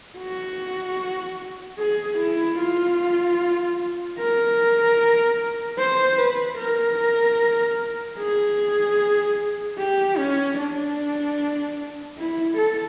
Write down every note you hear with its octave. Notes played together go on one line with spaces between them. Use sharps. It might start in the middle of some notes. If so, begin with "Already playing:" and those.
F#4
G#4
E4
F4
A#4
C5
B4
A#4
G#4
G4
C#4
D4
E4
A4